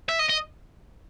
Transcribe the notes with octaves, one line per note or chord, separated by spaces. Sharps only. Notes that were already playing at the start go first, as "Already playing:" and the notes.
E5
D#5
D#5